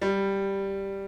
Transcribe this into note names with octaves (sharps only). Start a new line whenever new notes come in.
G3